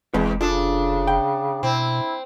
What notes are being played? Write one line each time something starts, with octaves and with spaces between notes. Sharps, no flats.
F1 E2 G#3 C4 B4
C#3 D4 F4 G#4 A4
G5
B2 C4 E4